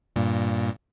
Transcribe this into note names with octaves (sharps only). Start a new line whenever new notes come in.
G2 A#2